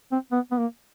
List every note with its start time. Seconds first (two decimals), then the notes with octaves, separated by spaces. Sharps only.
0.12 C4
0.32 B3
0.51 B3
0.58 A#3